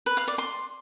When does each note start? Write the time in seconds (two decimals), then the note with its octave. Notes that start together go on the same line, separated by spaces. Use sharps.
0.06 B4
0.17 F5
0.28 D5
0.38 C6